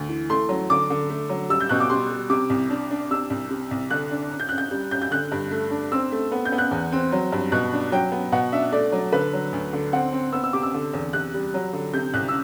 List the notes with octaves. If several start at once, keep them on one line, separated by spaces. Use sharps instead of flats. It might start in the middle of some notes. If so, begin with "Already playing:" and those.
Already playing: D2
E3
A3 C6
F#3
D3 D6
D3
A3
F#3
G3 E6
G6
B2 F#6
D6
G3 C6
G3
C3 D6
C2
D4
D4
C3 E6
C2
C3
C2
D3 F#6
D4
F#2
G6
F#2 F#6
G6
G3
F#2 G6
G6
D3 F#6
G2
A3
D4
C4 E6
A3
B3
G6
B3
F#6
E2
C4
F#3
G2
B2 F#6
D4
F#3 G5
B3
B2 F#5
D4 E5
A3 D5
F#3
D3 B4
F#3
D2
D3
C4 F#5
C4
B3 E6
E6
C3 D6
E6
D3
E2
C3 F#6
G3
F#3
D3
C3 G6
C2 F#6
E6